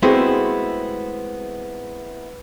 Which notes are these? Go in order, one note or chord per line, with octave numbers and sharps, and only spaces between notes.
G#3 A3 B3 C4 E4 F#4